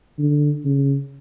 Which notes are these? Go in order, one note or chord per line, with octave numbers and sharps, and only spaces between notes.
D3
C#3